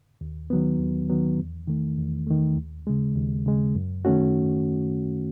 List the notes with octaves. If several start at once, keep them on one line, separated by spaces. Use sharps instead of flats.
D#2
D#3 F#3 B3
D#2
D#3 F#3 B3
E2
D#3 A3
E2
D#3 A3
D#2
C#3 G#3
D#2
C#3 G#3
F#2
D#3 A3 C#4 F#4